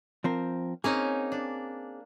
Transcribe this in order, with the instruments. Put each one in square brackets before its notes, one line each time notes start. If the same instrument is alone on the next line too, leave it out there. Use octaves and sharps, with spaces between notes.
[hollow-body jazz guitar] F3 C4 A#4
[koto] A#3 C#4 D#4 [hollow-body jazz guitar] C4 G#4
[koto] D4